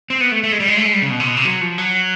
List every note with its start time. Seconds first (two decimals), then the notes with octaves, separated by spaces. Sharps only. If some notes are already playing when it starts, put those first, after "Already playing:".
0.10 C4
0.21 B3
0.32 A3
0.43 A3
0.52 G#3
0.60 G3
0.68 G#3
0.77 A3
0.85 G#3
0.93 G3
1.02 C#3
1.10 B2
1.20 C3
1.27 B2
1.37 C3
1.45 F#3
1.61 F3
1.78 F#3